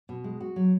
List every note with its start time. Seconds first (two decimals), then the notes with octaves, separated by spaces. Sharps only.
0.09 B2
0.24 G#3
0.41 F#4
0.56 F#3